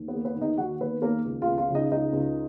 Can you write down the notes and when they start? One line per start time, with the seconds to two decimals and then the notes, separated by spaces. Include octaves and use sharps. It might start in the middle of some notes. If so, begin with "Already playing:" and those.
Already playing: D#2
0.08 B3 B4
0.14 A#3
0.25 B3 B4
0.36 D#2
0.41 D#4 D#5
0.57 D#3 F#4 F#5
0.80 A#3 B3 B4
1.02 D#2 A#3 A#4
1.25 C#2
1.42 F4 F5
1.47 C#2
1.58 F4 F5
1.70 C#3
1.75 D#4 D#5
1.91 C#2 D#4 D#5
2.13 C#2